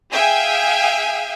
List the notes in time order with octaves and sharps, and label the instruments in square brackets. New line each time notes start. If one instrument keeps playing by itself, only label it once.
[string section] G#4 E5 F5 G5 G#5